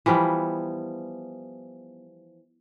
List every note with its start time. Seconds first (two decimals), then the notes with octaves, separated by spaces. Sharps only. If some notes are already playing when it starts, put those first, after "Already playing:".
0.06 E3 F3 G3 B3